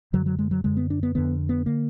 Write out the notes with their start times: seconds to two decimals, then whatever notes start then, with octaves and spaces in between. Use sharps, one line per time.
0.13 F#2 D3 F#3
0.26 F#3
0.39 G#3
0.51 F#3
0.64 F#2 D3 G#3
0.77 B3
0.90 D4
1.03 B3
1.15 F2 D3 B3
1.49 B3
1.66 D3 A#3